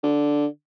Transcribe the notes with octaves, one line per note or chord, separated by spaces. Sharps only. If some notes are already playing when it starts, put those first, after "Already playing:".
D3